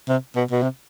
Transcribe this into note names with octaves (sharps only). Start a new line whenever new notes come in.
C3
B2
B2
C3